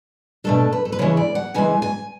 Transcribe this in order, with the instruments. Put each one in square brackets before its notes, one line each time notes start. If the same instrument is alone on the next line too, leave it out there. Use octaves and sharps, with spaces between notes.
[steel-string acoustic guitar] B2 A3 D4 A4
B4
A4
B4
C#3 E3 G#3 C#5
D5
F#5
C#3 E3 G#3 G#5
G#5